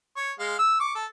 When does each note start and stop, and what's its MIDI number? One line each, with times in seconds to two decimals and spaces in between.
0.16 0.32 73
0.39 0.55 56
0.39 0.55 77
0.59 0.79 88
0.80 0.93 85
0.80 0.93 86
0.95 1.05 69